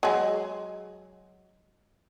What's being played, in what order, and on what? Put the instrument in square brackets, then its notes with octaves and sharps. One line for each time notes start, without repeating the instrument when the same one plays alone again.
[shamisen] F#3 G#3